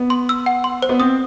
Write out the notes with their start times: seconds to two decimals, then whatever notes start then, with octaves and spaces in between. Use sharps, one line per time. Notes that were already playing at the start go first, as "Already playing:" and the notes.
Already playing: B3
0.10 C6
0.29 E6
0.46 F#5
0.64 C6
0.82 C5
0.89 B3
1.00 C4 D#6